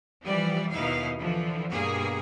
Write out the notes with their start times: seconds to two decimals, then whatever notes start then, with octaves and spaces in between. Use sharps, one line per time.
0.24 E3 F3 G3 D5
0.72 D#2 B2 D#4 E4 F5
1.20 D3 E3 F3
1.70 G2 B2 A#3 G#4